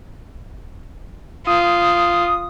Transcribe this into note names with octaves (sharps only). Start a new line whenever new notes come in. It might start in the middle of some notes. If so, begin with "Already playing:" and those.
F4 D#6